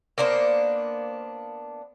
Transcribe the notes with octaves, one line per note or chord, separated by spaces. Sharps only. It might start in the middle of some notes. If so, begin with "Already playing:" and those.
A#3 B3 D4 C5